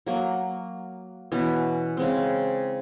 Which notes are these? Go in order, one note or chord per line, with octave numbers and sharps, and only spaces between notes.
F#3 A#3
B2 E3 C#4
C#3 G#3 C4